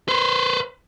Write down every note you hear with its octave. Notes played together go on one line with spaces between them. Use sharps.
B4 C5